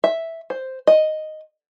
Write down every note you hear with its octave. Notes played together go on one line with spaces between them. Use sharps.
E5
C5
D#5